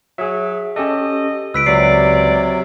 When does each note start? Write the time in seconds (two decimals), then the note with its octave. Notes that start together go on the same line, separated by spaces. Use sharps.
0.18 F#3 G#4 E5
0.76 C#4 G4 A4 D#5
1.54 C#2 B4 E6 B6 D7
1.66 C3 F#3 D5 C7